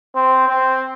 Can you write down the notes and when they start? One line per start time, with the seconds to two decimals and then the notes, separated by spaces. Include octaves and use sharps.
0.16 C4
0.49 C4